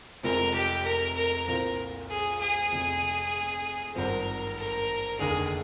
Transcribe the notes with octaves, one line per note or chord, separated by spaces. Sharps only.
F1 F2 C3 F3 G#3 A#4
G4
A#4
A#4
C2 A#2 F3 C4 F4 A#4
G#4
G#4
F1 F2 C3
G#1 G2 F3 C4 A#4
A#4
F1 D#2 D3 G#4